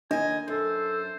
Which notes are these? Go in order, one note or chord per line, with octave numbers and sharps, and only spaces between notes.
D#2 D4 D#5 G#5
F#2 A4 C5